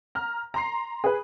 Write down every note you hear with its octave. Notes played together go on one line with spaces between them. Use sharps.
A#5 F6
A#5 C6 C7
G#4 B4